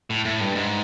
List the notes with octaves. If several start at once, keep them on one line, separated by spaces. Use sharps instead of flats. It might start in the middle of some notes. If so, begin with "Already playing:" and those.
A2
A2
G2
G#2